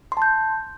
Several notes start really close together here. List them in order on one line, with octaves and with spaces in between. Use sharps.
C6 A5 G6